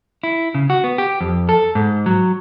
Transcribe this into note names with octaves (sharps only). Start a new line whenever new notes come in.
E4
C#3
F#4
B3
G4
F2
A4
G#2
F#3